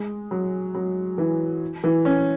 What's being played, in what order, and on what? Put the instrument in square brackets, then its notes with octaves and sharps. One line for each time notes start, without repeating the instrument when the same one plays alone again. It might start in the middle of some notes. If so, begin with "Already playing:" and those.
Already playing: [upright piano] G#3
F#3
F#3
E3
E3
C#4